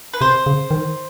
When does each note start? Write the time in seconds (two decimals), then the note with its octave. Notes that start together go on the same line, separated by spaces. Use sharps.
0.14 B4
0.21 C3 C5
0.46 C#3
0.71 D#3